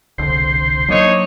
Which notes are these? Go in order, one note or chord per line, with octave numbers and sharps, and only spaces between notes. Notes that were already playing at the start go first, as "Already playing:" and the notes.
E1 C2 D3 C5
F#3 A#3 D4 D#4 C#5